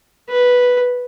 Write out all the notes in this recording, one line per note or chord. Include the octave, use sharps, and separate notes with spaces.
B4